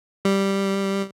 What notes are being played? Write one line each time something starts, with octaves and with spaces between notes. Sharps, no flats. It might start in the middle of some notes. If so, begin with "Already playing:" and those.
G3